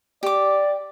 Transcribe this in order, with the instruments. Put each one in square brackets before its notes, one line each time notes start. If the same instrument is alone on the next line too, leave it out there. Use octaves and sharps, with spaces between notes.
[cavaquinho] G4 D6 [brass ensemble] D5